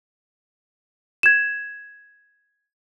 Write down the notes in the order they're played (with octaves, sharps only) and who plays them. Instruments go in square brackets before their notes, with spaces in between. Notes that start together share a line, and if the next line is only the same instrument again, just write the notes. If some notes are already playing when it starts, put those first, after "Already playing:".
[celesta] G#6 E7